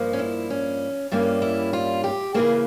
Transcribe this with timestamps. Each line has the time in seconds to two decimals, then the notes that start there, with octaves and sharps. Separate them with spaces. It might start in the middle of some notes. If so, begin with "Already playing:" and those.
Already playing: G2 F3 A#3
0.13 C#4
0.19 E4
0.50 C#4
1.12 G2 G3 A#3 C#4 E4
1.42 E4
1.73 F4
2.04 G4
2.34 C#3 E3 A#3 G#4